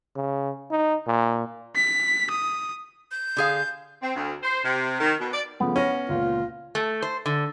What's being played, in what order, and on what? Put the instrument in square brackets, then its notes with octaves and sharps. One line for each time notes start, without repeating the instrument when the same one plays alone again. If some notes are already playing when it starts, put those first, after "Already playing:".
[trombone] C#3
D#4
A#2
[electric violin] B6
D#6
[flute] G6
[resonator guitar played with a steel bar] D3 G#4 F5
[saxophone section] C4
D2
C5
C3
D#3
B2
D5
[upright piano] C#3 F3 A3 [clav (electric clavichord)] B3
[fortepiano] C#4 [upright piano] C#6 F6 A#6
[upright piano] C#2 A#2 [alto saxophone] F4
[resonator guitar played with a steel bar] A3
C5
D3